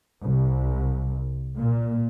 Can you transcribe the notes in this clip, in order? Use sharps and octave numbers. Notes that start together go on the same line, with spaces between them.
C2
A#2